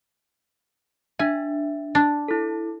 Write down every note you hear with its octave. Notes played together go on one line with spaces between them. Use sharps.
D4 E5 G#5
D4
E4 A4